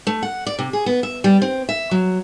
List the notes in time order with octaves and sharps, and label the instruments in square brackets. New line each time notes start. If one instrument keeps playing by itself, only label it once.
[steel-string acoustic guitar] A3
F#5
D5
C3
G#4
B3
E5
G3
C4
E5
F#3